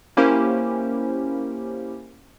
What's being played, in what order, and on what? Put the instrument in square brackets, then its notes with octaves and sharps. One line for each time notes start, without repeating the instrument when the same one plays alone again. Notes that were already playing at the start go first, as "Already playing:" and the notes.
[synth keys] A#3 C#4 E4 G4 A#4 C5